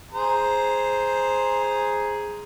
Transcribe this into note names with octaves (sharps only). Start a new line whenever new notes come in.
G#4 C5 A#5